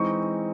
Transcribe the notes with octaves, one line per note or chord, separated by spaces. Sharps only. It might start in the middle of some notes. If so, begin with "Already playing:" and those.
Already playing: E3 G#3 C4 D#4 C#6